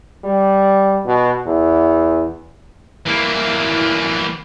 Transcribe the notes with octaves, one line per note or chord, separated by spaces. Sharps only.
G3
B2
E2
E3 A#3